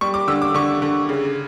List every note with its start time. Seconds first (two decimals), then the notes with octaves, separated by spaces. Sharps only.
0.01 G3 C#6
0.14 D6
0.28 D3 E6
0.42 D6
0.54 D3 C#6
0.82 D3
1.09 C#3